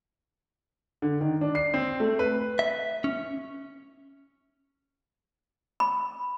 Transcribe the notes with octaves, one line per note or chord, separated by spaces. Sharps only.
D3
D#3
D4
C7
C4
A3
B4
E5
C#4
B5